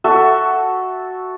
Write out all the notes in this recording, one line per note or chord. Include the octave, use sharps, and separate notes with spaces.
F#4 A4 E5